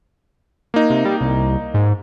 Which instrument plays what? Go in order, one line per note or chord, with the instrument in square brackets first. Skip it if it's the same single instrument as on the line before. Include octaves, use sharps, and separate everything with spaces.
[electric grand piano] A#3 D#4
[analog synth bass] C3
G3
C2
G#2